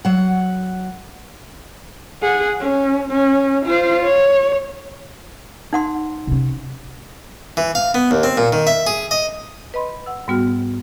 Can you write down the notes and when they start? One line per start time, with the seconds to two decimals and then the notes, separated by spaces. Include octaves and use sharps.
0.05 F#3 F#5
2.22 G#4 F#5
2.59 C#4
3.11 C#4
3.66 F4 C5
4.03 C#5
5.73 D#4 F#5 C6
6.27 C3 C#4
7.57 E3
7.75 F5
7.94 B3
8.11 D#2
8.23 C4
8.37 A#2
8.53 D#3
8.67 E5
8.87 G#4
9.11 D#5
9.74 B4 D#5 B5 C6
10.06 F#5 E6
10.28 G#2 G3 B3 F#4 F6